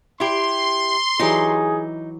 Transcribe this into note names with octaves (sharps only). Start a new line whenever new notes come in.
E4 G4 C6
E3 F#3 D#4 G4 G#4